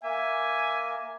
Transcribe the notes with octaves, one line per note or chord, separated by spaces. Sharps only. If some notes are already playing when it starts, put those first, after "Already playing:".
A#3 E5 G#5